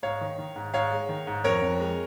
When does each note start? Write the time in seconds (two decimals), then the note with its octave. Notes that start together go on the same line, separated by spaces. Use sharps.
0.03 G#2 C#5 F5
0.21 D#3
0.38 D#3
0.56 G#2
0.74 G#2 C#5 F5
0.91 G#3
1.09 D#3
1.27 G#2
1.44 F2 A#4 C#5
1.62 F2
1.80 G#3